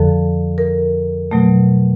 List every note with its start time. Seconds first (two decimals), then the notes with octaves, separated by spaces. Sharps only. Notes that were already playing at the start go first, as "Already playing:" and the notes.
Already playing: F2 D3 F3 A4
0.58 A#4
1.31 B2 F#3 A3